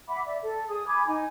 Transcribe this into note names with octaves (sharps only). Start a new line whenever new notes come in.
E5 F#5 B5 D6
D5 E5
A4
G#4 D#6
G#5 B5 D6 G#6
D#4 G#5